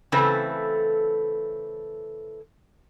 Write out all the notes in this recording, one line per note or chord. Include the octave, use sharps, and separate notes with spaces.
C#3 E3 A3 C4 A4 B4